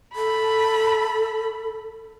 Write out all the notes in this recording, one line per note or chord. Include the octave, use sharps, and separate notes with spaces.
A4 B5